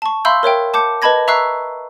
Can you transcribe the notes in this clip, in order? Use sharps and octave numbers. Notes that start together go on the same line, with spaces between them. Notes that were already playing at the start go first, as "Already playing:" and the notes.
A5 C#6
E5 F5 B5 C6 E6 G6
A#4 C#5 E5 G5
A5 D6 G6 C#7
B4 D#5 A5 B5 G#6 A#6
E5 A#5 C#6 E6 F#6 C7